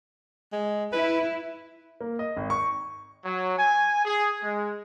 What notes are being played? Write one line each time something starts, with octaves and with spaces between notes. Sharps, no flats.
G#3
E4 B4
A#3
D#5
G#1
C#6
F#3
G#5
G#4
G#3